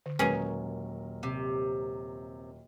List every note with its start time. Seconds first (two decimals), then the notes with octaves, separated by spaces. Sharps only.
0.06 D3
0.19 D#1 F#3 G#3 C#4 G#4 A#4 B4
1.23 C3